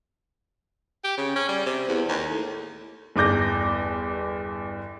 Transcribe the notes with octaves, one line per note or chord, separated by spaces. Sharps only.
G4
C#3
C#4
G3
C3
E2
D#2
A2
G1 E2 D6 G6 A#6